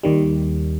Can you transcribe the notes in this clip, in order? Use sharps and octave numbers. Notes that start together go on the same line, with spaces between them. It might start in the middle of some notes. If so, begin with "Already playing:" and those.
D#2 D#3 G3